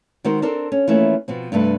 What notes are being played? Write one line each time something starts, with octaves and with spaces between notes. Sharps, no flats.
D#3 G#3 C4 F#4 A#4 C5
C4 D4 A4 A#4 C5 D5
C#4
E3 F3 A3 A#3 C#4 E4
B2 F3 C4
G2 C3 A3 D4 B4